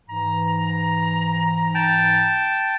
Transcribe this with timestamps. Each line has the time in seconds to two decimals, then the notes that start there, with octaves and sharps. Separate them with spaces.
0.09 G#2 E3 A#5
1.75 G5 A5